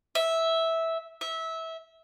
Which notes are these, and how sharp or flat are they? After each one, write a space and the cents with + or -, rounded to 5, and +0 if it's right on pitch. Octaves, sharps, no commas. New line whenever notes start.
E5 -10
E5 -20